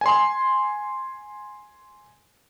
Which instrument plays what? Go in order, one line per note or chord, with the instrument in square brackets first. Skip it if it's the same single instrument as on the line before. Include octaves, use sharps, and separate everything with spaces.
[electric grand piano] G#5 C6